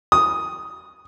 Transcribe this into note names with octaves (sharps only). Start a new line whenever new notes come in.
D#6